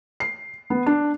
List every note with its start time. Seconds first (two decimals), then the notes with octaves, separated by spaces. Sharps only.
0.20 C7
0.70 B3
0.86 D4